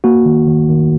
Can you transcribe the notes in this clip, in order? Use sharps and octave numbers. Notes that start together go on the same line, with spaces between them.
A#3 F#4
D#3
D#3
D#3